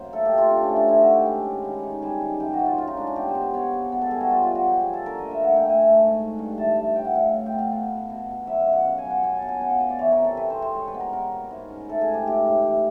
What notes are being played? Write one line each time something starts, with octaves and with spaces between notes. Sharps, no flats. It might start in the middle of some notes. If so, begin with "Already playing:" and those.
Already playing: F#2 A#3 C5
A3 A4
G4
A3
F4
C4 D4
C#4
A3
D4
D#3 E4
F#4
C#4
G4
G#3
C#4
D#3
D#3
G3 G#4
D#3
F#2 G4
F#4
F#2
F4
F#2 F4
D#4
G#3 D4
C#4
B2 G4
C5
B2
C5
B3 C#5
G#3
B3
A4
G3 G#4
F#4
G3 F4
F4
B3
F#4
F3 G4
G#4
F3
A4
D3 A#4
D#5
A#3
E5
A3 F#5
G5
A3
G#5
A3
G#2
G#3
G2
E3 A5
E3
A2 G5
F#5
A2 F5
A2
G5
B3
F5
B3
B2
B2
B2
F#3 E5
F5
F#2
F#5
F#2 F5
G#5
F#3
F#5
B2 G#5
A5
B2
G#5
B3 F#5
F5
B2 D#5
D5
E3 C#5
A#4
C3
A4
C3 B4
C5
C3
C5
G#3 C#5
B4
B3
A#4
B2 A#4
B2
G#2
C#4
A3 A4
G#4
G#2
G4
A3 G4
A2
E3